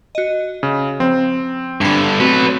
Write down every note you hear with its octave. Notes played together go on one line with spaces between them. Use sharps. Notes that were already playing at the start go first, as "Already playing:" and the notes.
F#4 D#5
C#3
F3 C4
G2 D3 B5 G#6
F#3 A3 C4 F#4 B4